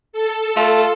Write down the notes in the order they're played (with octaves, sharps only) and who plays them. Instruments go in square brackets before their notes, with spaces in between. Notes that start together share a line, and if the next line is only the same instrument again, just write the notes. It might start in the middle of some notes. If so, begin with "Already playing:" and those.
[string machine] A4
[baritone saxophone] A3 [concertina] F4